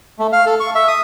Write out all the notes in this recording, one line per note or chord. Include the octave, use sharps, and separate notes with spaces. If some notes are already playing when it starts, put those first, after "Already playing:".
A3
F5
A4
C#6
E5
D#6